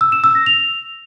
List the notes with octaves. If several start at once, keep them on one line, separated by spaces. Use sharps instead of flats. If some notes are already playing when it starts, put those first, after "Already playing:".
E6
E7
E6
A#6
F7